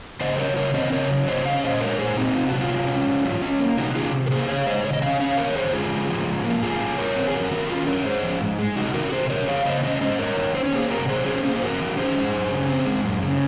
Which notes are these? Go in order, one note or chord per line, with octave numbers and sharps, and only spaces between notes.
C#3 C5 D#5
F#3 A#4 C#5
C#3 A#4 C#5
C4 C5 D#5
C#3 A#4 C#5
F#3
C#3 C5 D#5
C#4 C#5 F5
A#2 C5 D#5
G#3 A#4 C#5
A#2 G#4 C5
C4 D#4
C3 F4
F#3 F#4
F4
C3
C#4
G#2
F#3
C#4
A#3
C3 D#4 F#4
D#3 F4 G#4
C3
A#4
A#3 G#4 C5
C#3 C#5 F5
G#3 C5 D#5
C#3 C#5
D#5
C#4 C#5 F5
F2 C#5 F5
D#3 A#4 C#5
F2 G#4 C5
G#3 F4 G#4
G#2
F3
G#2
A#3
G#2 F4 G#4
F#3
G#2 A#4 C#5
C4
G#4
F2 F#4 A#4
D#3 F#4 A#4
C#4 F4
F#3 A#4 C#5
G#2 G#4 C5
F3
G#2
G#3
C3 D#4 F#4
D#3 F#4 A#4
C3 G#4 C5
F#3 A#4 C#5
F2 C#5 F5
C#3 C5 D#5
C#4 C5 D#5
C#5
G#3 C5 D#5
G#2 A#4 C#5
D#3
C#4 C5
C#5
A#3 G#4 C5
C3 F#4 A#4
F#3 G#4 C5
C#4 G#4 C5
A#3 G#4 C5
C5
F2 F#4 A#4
D#3
C#4 G#4 C5
G#3
F#2
C#3
C4
G#3
F#2
C#3